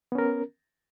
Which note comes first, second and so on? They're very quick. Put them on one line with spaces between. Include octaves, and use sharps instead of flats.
B3 C#4 A#4